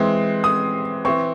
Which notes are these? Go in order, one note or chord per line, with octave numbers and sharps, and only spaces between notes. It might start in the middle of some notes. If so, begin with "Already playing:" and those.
Already playing: E3 G#3 C4
D#6
E3 C4 C#6